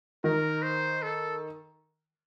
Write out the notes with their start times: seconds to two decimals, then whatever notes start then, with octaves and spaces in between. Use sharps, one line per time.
0.24 D#3 A#4
0.63 C5
1.03 A4